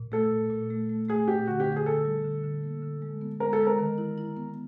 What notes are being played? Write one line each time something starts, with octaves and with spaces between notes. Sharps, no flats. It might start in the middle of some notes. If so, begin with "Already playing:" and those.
Already playing: A#2
A3 A4
A#2
A#2
A3
A3
A3 G#4
A#2 G4
D3 F#4
G4
D3
G#4
D3 A4
G3
D3
D3
A#3
D3
G#3
B3
G#3 A#4
A4
G#3
A#4
D#3
E4
E4
B3